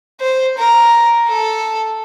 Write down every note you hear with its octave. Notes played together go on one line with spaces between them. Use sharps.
C5
A#4
A4